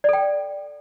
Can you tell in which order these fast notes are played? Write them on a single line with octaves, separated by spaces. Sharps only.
D5 A4 G5